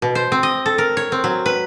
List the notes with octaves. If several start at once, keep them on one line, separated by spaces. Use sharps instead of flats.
B2
C5
C4
D#5
A4
A#4
C#5
C4
F#3
B4